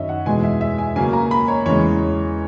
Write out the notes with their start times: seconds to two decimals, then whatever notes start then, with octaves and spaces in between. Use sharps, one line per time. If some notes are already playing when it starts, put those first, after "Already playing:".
Already playing: F#2 D#3 F#3 C#4 C#5 D#5 E5
0.09 F#5
0.26 E2 B2 G#3 G#5
0.43 E5
0.61 E5
0.78 G#5
0.96 C#3 F#3 A#3 C#4 G#5
1.13 A#5
1.31 B5
1.48 C#5
1.66 E2 C#3 G#3 C#5